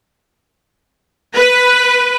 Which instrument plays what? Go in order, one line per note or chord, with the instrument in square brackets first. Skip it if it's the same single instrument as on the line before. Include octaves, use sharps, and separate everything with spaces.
[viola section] B4